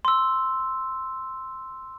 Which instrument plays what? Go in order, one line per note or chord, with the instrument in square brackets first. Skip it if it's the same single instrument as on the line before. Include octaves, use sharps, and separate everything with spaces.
[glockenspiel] C6 E6